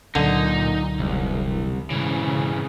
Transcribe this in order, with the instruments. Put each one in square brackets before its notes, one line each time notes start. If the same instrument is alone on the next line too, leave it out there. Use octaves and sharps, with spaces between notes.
[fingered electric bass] C#2 F#3 [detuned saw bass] A#2 [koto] D3 [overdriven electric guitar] D#4
[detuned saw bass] E1 [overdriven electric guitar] C2
[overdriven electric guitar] G#2 E3 [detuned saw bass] C#3